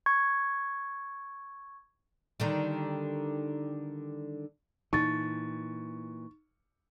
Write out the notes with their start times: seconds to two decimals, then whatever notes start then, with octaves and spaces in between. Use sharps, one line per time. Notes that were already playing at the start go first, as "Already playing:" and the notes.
0.06 C#6 G#6
2.40 D3 D#3 G3
4.93 A#2 E3 D#4 C#6 A6